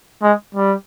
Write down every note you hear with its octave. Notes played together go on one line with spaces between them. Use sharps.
G#3
G3